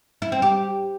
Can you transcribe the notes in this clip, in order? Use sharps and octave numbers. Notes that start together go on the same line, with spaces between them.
E4
C4
G4